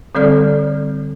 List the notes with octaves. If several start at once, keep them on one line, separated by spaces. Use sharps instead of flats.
D3 G3 C4 A4 D5 F6